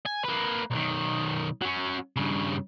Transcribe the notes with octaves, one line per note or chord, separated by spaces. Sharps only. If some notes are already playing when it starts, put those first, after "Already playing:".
G#5
A#3 B4
B1 D#3
F#3 C#4
G2 C#3